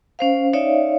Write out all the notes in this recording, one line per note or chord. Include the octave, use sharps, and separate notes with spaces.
C#4 C5 F5
D#4 C#5 D5 E5 F5